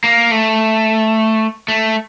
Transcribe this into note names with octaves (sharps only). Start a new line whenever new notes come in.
A#3
A3
A3